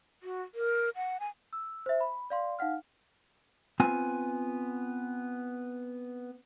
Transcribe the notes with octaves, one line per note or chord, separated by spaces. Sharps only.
F#4
A#4
F#5
G#5
E6
C5 E5
B5
D5 F5 C6
D#4 F5 F#5 F6
B3 C4 F4 G#5